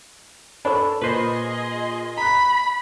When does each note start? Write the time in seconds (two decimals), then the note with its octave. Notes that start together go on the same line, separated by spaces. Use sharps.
0.65 D4 A4 C#5 B5
1.01 A#2 G#4 B4 C5 D#5 C6
2.17 A#5 B5 F#6